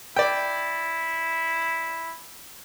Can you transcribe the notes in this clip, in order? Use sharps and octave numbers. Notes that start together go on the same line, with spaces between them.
E4 D5 G5